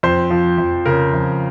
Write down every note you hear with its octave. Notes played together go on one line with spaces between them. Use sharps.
F2 C5
F3
F2
C#3 A#4
F2